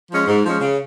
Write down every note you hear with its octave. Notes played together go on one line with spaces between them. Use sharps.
F3 G#3 C#4
G#2
F3 G#3 C#4
C#3